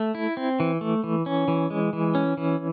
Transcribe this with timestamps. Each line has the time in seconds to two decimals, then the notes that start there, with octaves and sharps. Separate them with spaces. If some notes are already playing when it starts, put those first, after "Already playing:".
Already playing: A3
0.15 E4
0.37 C4
0.60 E3
0.81 A3
1.04 E3
1.26 C#4
1.48 E3
1.70 G#3
1.93 E3
2.15 C#4
2.37 E3